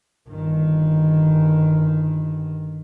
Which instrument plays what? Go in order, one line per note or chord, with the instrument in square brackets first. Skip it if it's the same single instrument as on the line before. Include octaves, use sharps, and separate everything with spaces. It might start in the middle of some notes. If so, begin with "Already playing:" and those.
[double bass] G1 D#3